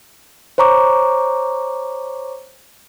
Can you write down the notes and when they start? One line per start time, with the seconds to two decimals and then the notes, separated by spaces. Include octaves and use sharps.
0.58 C5 C#5 A#5 C#6 D6